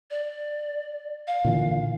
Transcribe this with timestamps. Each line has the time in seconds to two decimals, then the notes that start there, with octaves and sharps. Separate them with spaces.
0.11 D5
1.27 F5
1.45 A#2 D3 E3